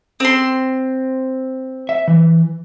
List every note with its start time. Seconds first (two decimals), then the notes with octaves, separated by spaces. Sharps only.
0.20 C4 C6
1.89 E5
2.08 E3